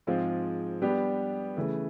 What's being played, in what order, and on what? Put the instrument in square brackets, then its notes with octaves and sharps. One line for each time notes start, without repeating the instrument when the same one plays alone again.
[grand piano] G#2 F3 G#3 C4 F4
G3 B3 D4 G4
C#3 E3 A3